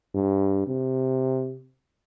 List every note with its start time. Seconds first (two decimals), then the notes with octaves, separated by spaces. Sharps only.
0.15 G2
0.67 C3